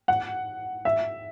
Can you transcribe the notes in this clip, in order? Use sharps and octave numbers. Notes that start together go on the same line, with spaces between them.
F#5
E5